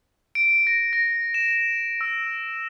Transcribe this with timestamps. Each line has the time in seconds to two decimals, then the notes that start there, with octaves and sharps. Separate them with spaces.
0.35 D7
0.67 A#6
0.93 A#6
1.34 E7
2.01 E6